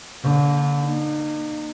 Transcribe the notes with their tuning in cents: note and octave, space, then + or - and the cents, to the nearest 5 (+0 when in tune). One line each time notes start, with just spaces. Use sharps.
D3 -35 A#3 +0
A#3 +0 D#4 -40